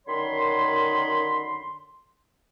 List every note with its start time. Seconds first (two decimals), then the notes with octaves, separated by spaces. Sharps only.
0.07 F#2 D3 D#3 C#5 B5 C6